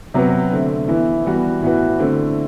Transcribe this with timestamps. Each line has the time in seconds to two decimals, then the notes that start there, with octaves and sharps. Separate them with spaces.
0.14 C3 F#3 B3 F#4 B4
0.51 D3 A3 C4
0.88 E3 B3 E4
1.25 E3 G3 B3 F#4
1.62 A2 E3 B3 F#4 B4
2.00 D3 A3 C4 E4